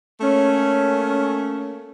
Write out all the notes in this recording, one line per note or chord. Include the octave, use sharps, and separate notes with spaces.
A3 A#3 C#4